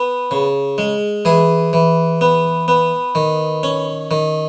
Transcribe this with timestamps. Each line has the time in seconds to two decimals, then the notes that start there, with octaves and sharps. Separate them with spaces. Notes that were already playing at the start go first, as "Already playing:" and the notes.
Already playing: B3
0.31 C#3
0.78 G#3
1.25 E3 G#4
1.73 E3
2.21 B3
2.68 B3
3.15 D#3
3.63 C#4
4.11 D#3